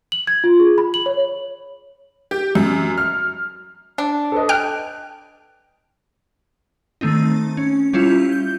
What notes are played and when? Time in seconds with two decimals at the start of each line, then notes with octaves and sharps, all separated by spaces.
0.12 F#7
0.27 G#6
0.44 F4
0.60 G#4
0.78 B5
0.94 F#7
1.06 C#5
2.31 G4
2.55 F#2
2.98 F6
3.98 D4
4.32 A4 B4 D#5
4.49 G5 F6 F#6 D7
7.01 D#3 A3 C4 D#4
7.57 C#4
7.93 G3 C#4 E4 F4
8.32 G6